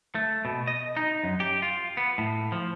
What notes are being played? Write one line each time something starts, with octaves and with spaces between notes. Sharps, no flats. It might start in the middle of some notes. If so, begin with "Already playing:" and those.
A3
B2
D#5
D#4
F#2
G4
F4
B3
A2
F3